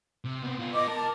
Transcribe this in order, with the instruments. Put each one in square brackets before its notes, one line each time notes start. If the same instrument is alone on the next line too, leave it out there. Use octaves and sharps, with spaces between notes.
[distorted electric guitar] C3
B3 C4
B3 F4
[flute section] D#5 D6
[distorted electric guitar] A#4 [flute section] A5